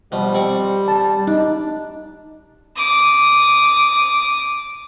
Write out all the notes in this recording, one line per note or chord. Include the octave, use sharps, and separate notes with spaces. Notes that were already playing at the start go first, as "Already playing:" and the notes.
B2 F3 G3
C4 D5 C#6
A5
D4 D#4
D6 D#6